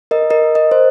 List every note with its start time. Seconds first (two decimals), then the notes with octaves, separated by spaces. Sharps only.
0.11 A#4 D#5
0.30 A#4 D#5
0.55 A#4 D#5
0.71 C5